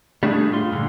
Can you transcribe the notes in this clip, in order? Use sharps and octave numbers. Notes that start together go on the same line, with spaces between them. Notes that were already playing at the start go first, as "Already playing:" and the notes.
G3 A3 D4 F#4 G#4
A2 F4 C6
G2 A#2 D3